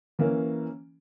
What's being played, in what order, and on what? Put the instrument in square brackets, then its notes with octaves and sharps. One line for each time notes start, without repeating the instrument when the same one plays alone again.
[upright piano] E3 A#3 C#4